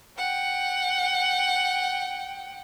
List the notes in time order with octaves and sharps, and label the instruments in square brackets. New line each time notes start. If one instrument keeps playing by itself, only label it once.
[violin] F#5 G5